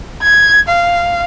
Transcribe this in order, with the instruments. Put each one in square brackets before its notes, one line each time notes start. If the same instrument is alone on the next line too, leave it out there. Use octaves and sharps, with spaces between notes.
[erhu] G#6
F5